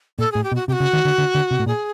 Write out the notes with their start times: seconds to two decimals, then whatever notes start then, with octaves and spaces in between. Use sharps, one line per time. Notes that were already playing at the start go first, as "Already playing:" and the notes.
0.19 A#2 A4
0.32 A2 G#4
0.44 G4
0.52 B2
0.55 F#4
0.68 C3 G4
0.73 F#4
0.80 C#3
0.93 D#3
1.05 D3
1.18 D3
1.35 D3
1.51 C3
1.60 A2
1.66 A#2 G#4